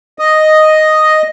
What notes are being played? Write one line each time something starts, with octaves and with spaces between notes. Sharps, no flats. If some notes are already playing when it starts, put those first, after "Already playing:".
D#5